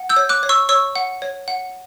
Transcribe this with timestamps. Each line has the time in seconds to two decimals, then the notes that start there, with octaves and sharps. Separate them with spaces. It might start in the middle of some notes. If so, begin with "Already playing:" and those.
Already playing: F#5
0.09 E6 G6
0.16 C#5
0.29 D6 F#6
0.43 C#5
0.49 C#6 E6
0.69 C#5 C#6 E6
0.95 F#5
1.22 C#5
1.48 F#5